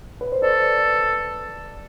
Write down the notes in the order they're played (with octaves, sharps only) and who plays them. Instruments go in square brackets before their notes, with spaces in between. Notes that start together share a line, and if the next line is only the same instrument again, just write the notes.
[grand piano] B4
C5
[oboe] A4 [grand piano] B4 D5